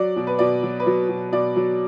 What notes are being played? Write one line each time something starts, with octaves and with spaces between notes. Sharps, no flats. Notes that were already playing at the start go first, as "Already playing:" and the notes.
Already playing: F#3 D5
B2
B4
B2 D5
F#3
B4
F#3 D5
B2
B2 D5
F#3